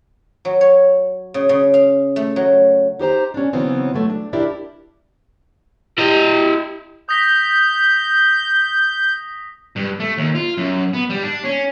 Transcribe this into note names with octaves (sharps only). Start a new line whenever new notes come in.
F#3
C#5
C#3
C#3
F5
A3
F#3
D#4 G4 C5 A#5
C#4 D4
C#3 E3 F#3 B3 C4
E3 F#3 A3
D4
D4 E4 G4 A#4 D5
E4 G4 D#5
D#6 G6 A#6 B6
G2
A3
D#2
F4
F#2
B3
G3
D4
C#4